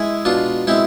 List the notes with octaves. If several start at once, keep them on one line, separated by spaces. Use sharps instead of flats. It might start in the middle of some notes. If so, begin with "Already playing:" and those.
Already playing: G#3 E4 G#4
B2 D4 F4
G#3 C4 E4